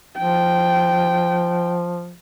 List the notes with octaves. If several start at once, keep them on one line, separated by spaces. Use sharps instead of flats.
F3 G5